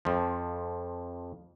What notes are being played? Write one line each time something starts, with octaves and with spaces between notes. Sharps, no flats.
F2 F3